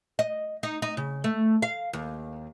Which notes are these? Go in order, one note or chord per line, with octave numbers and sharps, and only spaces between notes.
D#5
D#4
D#4
C#3
A3
F5
D#2